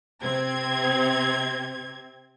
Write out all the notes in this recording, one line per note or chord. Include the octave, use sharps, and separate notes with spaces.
C3 C4 G#6